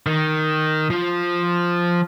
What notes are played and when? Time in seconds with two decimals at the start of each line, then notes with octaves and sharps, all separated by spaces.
0.06 D#3
0.90 F3